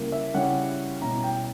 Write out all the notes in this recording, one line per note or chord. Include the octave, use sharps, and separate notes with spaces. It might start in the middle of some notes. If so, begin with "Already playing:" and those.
Already playing: C#3 G3 A#3 E4
E5
C#3 G3 C#4 E4 F#5
B2 G3 C#4 E4 A#5
G5